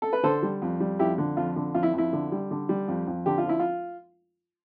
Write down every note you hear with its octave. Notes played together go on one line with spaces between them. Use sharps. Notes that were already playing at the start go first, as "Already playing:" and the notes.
A4
B4
D3 A4 C5
G3
F2
G3
F2 E4 G4
D3
F2 F4
D3
F2 F4
E4
F2 E4
D3
G3
D3
G3
F2
F2
D3 G4
F4
F3 E4
F4